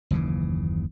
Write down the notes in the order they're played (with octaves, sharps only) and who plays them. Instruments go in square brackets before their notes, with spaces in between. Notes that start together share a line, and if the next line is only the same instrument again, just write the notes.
[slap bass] F#1 D#2 C#3 E3